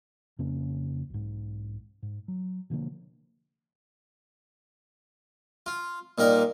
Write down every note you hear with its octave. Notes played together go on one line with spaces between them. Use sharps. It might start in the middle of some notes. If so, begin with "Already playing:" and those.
F2 C#3 A#3 C#4
B1 G#2
G#2
F#3
B2 D3 F3 A#3
F4
A#2 G3 D#4 A#4